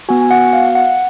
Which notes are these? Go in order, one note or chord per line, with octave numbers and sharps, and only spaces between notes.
B3 F#4 G#5
G#5
F#5
F5
F#5